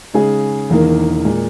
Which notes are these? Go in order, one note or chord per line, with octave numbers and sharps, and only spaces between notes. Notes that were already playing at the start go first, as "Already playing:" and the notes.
C#3 G#3 D#4 G#4
E1 E2 D#3 A#3
A#2 G#3